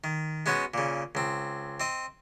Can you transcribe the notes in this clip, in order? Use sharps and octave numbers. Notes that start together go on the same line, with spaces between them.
D#3
G#3 B3 C#4 F#4
A#2 C#3
C#2 C4
C4 D#5